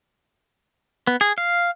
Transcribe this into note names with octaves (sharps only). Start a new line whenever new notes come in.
B3
G#4
F5